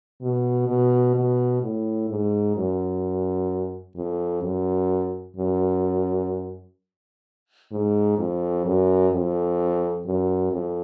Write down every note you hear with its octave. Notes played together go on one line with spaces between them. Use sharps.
B2
B2
B2
A2
G#2
F#2
F2
F#2
F#2
G#2
F2
F#2
F2
F#2
F2